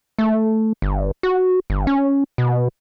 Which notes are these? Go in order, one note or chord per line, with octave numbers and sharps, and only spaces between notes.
A3
G1
F#4
G1
C#4
B2